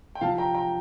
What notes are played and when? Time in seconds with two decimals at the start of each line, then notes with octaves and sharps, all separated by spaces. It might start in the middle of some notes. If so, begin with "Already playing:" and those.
0.15 G5
0.21 C3 F3 F5 A5
0.38 G5 A#5
0.54 G5 A#5